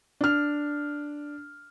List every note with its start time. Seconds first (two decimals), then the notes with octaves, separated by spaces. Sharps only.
0.21 D4 F6